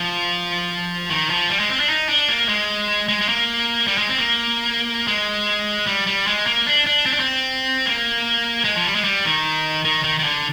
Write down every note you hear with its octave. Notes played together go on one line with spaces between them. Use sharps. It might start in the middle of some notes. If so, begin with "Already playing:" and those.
Already playing: F3
D#3
F3
G3
G#3
C4
D4
D#4
D4
A#3
G#3
G#3
G#3
A#3
G3
G#3
C4
A#3
G#3
G3
G3
G#3
A#3
D4
D4
C4
D4
C4
A#3
G#3
F3
G3
G#3
G3
D#3
D#3
D#3
D#3
D3